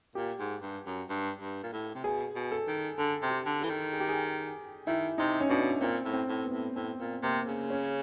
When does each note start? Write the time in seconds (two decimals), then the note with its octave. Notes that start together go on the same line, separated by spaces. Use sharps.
0.15 A#2 G4
0.39 G#2
0.62 G2
0.86 F#2
1.09 G2
1.41 G2
1.63 A#2
1.72 A2
1.95 C3
2.04 B2 G#4
2.35 B2
2.51 A4
2.67 D#3
2.98 D3 A4
3.22 C3
3.30 G4
3.46 D3
3.62 E3 A4
3.69 D#3
3.93 G#4
4.00 G4
4.09 G#4
4.87 D#3 E4
5.18 C3 D#4
5.40 C#4
5.50 B2 D4
5.81 A#2 C4
6.05 A2
6.13 C4
6.29 A2
6.44 B3
6.52 A2
6.75 A2 C4
7.00 A#2
7.23 C3 A#3
7.47 C#3
7.70 C#4